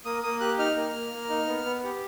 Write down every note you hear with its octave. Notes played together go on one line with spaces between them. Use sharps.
A#3 D#6
A#3 D#6
G4 F#6
D#4 F6
A#3
A#3
A#3
D#4
B3
B3
G4